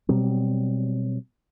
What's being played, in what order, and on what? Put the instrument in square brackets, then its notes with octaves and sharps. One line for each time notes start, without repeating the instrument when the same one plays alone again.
[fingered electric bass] B2 F#3 G3 C4